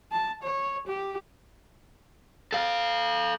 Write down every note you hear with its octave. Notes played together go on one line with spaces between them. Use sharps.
A5
C#5
G4
A4 F5